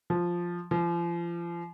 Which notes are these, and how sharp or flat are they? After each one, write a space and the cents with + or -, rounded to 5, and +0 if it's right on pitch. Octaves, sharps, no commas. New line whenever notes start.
F3 +0
F3 -35